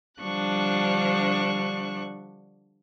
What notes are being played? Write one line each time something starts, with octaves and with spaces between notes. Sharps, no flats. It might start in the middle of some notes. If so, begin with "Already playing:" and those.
D3 F3 G3 D4 C#6 F#6